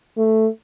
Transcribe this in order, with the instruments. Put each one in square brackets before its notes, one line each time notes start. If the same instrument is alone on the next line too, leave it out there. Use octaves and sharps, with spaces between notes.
[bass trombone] A3